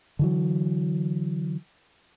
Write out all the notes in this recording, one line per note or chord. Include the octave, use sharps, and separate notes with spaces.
D3 E3 F#3